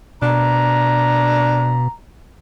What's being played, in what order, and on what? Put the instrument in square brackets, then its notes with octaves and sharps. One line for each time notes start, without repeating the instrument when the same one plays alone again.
[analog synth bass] B2 [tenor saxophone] D4 [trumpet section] A#5